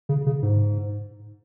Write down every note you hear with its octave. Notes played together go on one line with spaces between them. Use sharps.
C#3
C#3
G#2